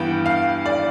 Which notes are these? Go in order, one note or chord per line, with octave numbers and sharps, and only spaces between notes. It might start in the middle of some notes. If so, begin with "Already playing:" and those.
Already playing: G2 E3 B3 G5
F5
D5